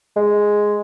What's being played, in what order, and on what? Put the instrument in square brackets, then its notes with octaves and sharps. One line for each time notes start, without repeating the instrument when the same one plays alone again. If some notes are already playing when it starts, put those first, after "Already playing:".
[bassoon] G#3